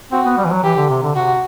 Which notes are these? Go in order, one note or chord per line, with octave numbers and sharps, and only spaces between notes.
C4 F#4
B3
G3
E3
F#3
E3 G4
D3
C3
D3
C3 F#4